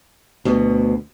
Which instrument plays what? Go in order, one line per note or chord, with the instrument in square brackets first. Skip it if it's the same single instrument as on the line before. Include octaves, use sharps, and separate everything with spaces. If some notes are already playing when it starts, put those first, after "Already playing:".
[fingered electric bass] D2 B2